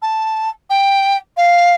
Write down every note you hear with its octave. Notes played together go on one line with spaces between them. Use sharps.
A5
G5
F5